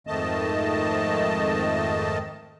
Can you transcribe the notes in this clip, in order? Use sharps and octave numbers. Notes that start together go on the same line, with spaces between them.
F2 G#2 D#3 A3 D#5 A5